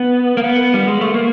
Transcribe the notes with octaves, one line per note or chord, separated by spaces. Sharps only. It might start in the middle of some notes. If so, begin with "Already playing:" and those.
Already playing: B3
A#3
B3
G3
G#3
A3
A#3